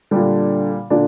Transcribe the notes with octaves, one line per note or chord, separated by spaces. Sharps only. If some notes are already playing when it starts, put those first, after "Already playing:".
A#2 D3 G3 D4
A#2 D3 D4